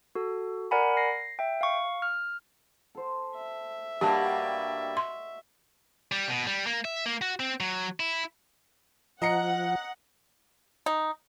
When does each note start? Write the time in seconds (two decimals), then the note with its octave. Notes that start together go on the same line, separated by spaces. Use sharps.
0.15 F#4 A4
0.71 A#4 D5 F#5 G#5 A#5 B5
0.97 A#6 C7
1.39 E5 G5
1.61 F5 C#6
2.02 F6
2.95 A4 C5
3.36 E5
4.01 G2 G3 A#3 F#4 G4 C#5 D#5 A5
4.97 C6
6.12 G3
6.29 B2
6.46 G3
6.66 A#3
6.85 E5
7.06 A#3
7.22 F#4
7.40 C4
7.60 F#3
8.00 E4
9.22 F3 D#5 F#5 A#5 C#7
10.86 D#4